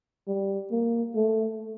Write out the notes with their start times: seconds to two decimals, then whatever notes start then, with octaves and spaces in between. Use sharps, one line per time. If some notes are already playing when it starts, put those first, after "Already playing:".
0.28 G3
0.71 A#3
1.15 A3